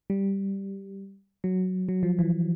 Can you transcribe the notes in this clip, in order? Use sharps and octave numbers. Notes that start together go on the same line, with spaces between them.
G3
F#3
F#3
F3
E3